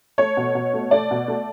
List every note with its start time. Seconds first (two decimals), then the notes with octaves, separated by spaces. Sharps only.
0.18 A3 C#5
0.37 B2
0.55 B2
0.74 A3
0.91 A3 D5
1.11 B2
1.28 A3